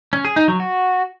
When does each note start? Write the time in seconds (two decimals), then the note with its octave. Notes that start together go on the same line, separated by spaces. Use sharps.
0.13 C#4
0.25 G#4
0.36 D#4
0.48 F#3
0.60 F#4